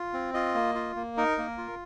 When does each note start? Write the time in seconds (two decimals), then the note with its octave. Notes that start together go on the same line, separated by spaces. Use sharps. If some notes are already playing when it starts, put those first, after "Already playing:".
Already playing: F4
0.13 C4
0.34 F4 D#5
0.55 A#3
0.75 F4
0.96 A#3
1.17 D#4 A#4
1.38 A#3
1.58 F4